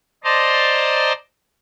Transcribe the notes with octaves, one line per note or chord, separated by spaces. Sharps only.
C5 D5 D#5 A5 A#5 C6